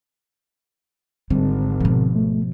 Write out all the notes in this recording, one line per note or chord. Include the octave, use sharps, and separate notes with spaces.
G#1 D3 G3 C4
B2 F3
A3